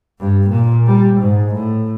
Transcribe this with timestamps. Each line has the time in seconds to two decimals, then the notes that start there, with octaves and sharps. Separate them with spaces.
0.20 G2
0.50 A#2
0.86 G3
1.18 G#2
1.54 A2